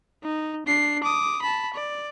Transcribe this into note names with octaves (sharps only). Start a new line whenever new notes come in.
D#4
D4 C7
D6 D#6
A5 B5
D5